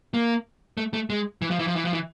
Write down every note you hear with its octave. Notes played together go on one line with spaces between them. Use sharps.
A#3
A3
A3
G#3
E3
F3
E3
F3
E3
F3
E3